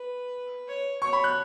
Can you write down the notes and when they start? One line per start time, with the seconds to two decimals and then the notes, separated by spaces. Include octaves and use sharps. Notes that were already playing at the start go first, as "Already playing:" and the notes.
Already playing: B4
0.68 C#5
1.01 C#5 C#6
1.13 B5
1.24 F#6